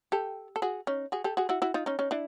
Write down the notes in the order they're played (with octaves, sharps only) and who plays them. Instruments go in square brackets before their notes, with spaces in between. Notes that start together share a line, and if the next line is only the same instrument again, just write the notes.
[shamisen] G4 A4
A4
F#4 G#4
C#4 D#4
F#4 G#4
G4 A4
F#4 G#4
E4 F#4
E4 F#4
D#4 F4
C#4 D#4
C#4 D#4
D4 E4